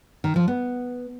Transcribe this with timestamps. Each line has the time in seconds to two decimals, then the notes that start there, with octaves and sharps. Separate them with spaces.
0.24 D#3
0.36 F3
0.48 B3